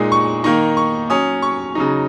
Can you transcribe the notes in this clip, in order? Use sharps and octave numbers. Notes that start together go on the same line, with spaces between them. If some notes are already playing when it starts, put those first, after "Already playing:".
Already playing: A#2 G#3 D#4 D#6
C#6
D#3 A#3 D#4 C#6
C#6
F#3 C#4 D#6
C#6
C#3 F#3 D#4